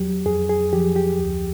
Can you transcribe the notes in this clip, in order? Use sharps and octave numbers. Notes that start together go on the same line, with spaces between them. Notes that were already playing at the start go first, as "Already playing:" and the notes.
Already playing: E2 F#3 G4
F2 G#4
G#4
F3 G4
G4
D2